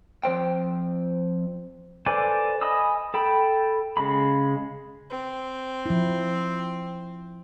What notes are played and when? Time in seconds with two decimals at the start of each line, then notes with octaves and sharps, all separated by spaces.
0.23 F2 C5 G5
2.06 A4 B4 C5 D5 G#5
2.61 D#5 G#5 B5 D#6 E6
3.14 A4 G5 B5
3.97 C#3 G#3 B5
5.09 C4
5.86 F3 E4